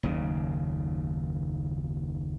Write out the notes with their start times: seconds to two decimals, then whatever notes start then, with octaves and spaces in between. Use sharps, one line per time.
0.03 F#1 D#2 C#3